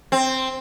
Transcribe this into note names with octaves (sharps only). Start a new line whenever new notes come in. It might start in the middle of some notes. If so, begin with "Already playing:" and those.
C4